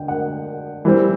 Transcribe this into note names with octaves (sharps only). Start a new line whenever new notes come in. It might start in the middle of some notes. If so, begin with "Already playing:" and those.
Already playing: D3 G5
F#5
E3 G3 C4